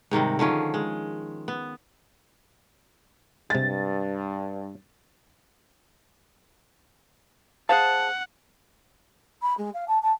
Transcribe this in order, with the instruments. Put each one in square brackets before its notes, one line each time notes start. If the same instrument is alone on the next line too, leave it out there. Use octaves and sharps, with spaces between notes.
[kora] G#2 C3 D#3 G3
D3 D#3 F3 C#4
G#3
B3
[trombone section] G2 [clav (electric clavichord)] C3 G#3 [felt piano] A6
[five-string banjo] G#4 C5 F5 [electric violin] F#5 [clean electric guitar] A5
[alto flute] B5
G#3
F5
A5
A5